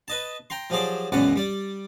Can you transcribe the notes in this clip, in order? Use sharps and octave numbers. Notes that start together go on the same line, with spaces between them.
B4 D#5 A5
G5 A#5 C6
F3 F#3 G4 G#4 C5 D5
C#2 F#2 B2 E3 D5 F#5
G3 D5